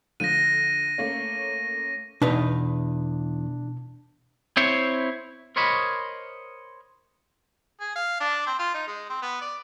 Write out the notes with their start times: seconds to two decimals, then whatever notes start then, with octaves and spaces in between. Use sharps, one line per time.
0.20 D3 F3 A#6 D#7
0.98 A3 A#3 C#4
2.22 E2 B2 D4 D#4 B4
4.57 C4 E4 C5 C#5
5.56 A#4 C5 C#5 D#5 B5
7.80 G#4
7.95 F5
8.20 D4
8.47 C4
8.59 F4
8.74 D#4
8.87 G#3
9.10 C4
9.22 B3
9.41 D5